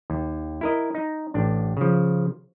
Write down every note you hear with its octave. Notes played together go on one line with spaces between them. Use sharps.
D#2
E4 A#4 D#5
D#4
A1 D4
C#3 F3